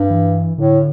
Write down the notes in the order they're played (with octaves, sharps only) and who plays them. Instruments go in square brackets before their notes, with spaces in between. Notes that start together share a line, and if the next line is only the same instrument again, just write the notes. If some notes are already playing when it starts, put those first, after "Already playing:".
Already playing: [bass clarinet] G2
[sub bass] E3
[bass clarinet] A2 [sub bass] D3